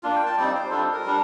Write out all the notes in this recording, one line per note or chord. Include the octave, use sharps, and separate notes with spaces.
A#3 D4 F4
G5
A5
G3 C4 D#4 D5
C5
G3 D4 F4 A4
A#4
G3 D4